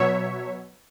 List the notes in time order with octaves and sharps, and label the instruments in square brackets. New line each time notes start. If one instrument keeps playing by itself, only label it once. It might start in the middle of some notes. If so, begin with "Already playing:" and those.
Already playing: [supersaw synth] B2 F#3 C#5 E5